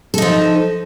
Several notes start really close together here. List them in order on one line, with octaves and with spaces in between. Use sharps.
A4 D#4 F3